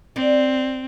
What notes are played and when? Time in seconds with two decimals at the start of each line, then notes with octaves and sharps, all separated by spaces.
0.16 C4 D5